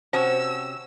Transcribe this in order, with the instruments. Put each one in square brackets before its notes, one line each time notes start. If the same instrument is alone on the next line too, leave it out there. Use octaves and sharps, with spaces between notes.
[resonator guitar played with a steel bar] C3 C#4 F#4 [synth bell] C5 [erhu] E6